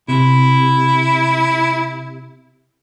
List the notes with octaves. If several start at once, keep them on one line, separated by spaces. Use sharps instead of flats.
C3 E4